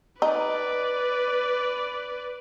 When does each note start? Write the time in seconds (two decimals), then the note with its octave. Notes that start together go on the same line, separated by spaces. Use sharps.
0.22 D#4 B4 D5